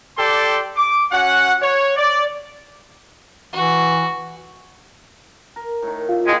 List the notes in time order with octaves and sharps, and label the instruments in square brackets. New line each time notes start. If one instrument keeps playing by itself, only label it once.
[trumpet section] G4 A4 D5 G5 C6
D6
C#4 F#4 F#5
C#5
D5
[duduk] E3 [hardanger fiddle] F#4
[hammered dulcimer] A#4
A2 D#3
[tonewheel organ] F4 [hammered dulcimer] E5
[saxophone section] D#2 G#3